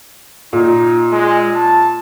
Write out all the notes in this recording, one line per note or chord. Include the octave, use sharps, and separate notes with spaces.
A#2 D#4
G#3
A5